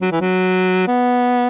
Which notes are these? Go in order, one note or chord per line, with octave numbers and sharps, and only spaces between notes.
F#3
E3
F#3
B3